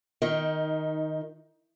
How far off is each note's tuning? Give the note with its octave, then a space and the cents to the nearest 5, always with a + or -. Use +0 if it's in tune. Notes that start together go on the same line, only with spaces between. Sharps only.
D#3 +0 D#4 +20